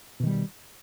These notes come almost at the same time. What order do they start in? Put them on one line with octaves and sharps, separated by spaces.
B2 D#3 G3